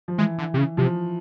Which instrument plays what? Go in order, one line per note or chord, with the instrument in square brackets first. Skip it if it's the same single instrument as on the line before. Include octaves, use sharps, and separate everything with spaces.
[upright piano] F3
[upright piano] E3 [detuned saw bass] G#3
[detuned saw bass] D3
C3
C#3
[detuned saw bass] C3 [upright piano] F3